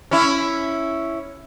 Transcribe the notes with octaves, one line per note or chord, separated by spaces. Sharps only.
C#4 E4